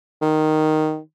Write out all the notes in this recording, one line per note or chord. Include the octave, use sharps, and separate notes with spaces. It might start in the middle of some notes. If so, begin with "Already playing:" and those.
D#3